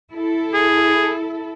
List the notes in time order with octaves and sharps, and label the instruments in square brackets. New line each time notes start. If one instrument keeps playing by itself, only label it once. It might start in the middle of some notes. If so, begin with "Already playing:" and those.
[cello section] E4 A4
[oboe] G#4